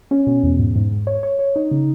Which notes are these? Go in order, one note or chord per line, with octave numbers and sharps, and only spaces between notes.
C#4
B2
E2
G#2
G#2
G#2
C#5
C#5
C#5
D#4
C#3